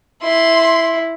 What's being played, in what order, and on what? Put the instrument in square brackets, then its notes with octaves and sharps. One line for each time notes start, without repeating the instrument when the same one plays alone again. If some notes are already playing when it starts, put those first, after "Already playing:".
[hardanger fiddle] E4 [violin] C6